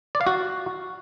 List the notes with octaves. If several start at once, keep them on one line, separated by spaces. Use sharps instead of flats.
D5
F5
F#4